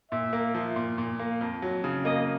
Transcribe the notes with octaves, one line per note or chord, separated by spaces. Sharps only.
A#2 E5
A#3
F3
A#2
A#2
A#3
F2
F#3
C#3
A#3 D#5